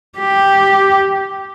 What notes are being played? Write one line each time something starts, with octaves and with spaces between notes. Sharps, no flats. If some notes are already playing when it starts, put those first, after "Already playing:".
G4